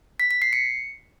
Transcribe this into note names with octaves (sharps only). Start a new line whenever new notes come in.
B6
B6
C7
C#7